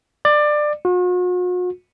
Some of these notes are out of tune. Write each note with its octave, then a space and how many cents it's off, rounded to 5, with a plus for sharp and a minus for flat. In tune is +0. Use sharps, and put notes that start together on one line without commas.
D5 +20
F#4 -45